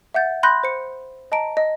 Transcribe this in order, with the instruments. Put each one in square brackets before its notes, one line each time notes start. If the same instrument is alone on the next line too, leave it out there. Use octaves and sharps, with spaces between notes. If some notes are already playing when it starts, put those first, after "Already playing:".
[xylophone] E5 F#5 G6 A6
B5 C6 F#6 G6 A#6
C5 C#7
D#5 A5 A#5 D7
D#5